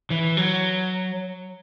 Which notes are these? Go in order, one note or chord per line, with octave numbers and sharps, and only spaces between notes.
E3
F#3